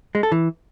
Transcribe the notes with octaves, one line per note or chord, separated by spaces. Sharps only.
G#3
A4
E3